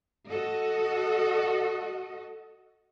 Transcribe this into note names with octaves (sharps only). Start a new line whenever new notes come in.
F#4 A4 D#5